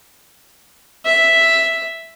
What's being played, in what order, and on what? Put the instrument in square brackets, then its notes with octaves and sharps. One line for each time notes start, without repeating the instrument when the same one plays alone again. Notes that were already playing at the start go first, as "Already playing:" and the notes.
[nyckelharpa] E5